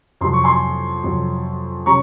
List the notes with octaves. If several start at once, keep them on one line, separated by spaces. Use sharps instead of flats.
F2 C3 F#3 C6
C#6
G#5 C6
F2 C3 F#3
C3 F#3 C#4 A#5 C#6